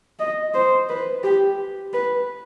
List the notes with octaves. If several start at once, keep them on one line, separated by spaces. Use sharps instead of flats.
D#5
C5
B4
G4
B4